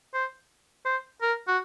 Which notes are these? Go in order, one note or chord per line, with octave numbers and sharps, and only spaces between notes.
C5
C5
A#4
F#4